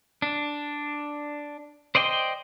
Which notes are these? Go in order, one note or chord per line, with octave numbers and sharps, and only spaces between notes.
D4
C5 D5 D#5 G5 C6